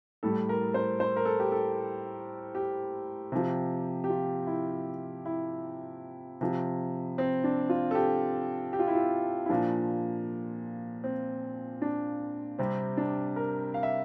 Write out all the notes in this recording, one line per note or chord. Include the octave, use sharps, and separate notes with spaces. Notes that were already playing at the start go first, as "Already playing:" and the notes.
A2 G3 A4
A#4
C5
C5
A#4
A4
G4
A4
G4
C3 F3
G4
F4
E4
E4
C3 F3
C4
D4
F4
A4
G4
G4
F4
E4
F4
E4
A#2 F3 D4
C4
D4
C3 G3 C4
D4
A#4
F5
E5